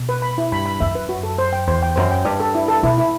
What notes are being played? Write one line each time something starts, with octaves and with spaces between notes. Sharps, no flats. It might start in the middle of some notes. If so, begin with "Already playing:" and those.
Already playing: B2
B4
B5
E4
G2 B5
B5
F#2 E5
B4
F#4
A4
C5
G5
E2 C5
G5
F#2 C5
G5
G2 D5
A4
E4
A4
B2 E4
E4